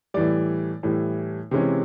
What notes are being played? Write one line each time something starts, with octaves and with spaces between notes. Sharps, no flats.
A2 E3 G3 D5
A2 E3 G3
C3 E3 G#3 C#4